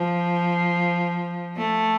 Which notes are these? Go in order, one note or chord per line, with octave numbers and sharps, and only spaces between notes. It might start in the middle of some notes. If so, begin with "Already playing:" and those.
Already playing: F3
A3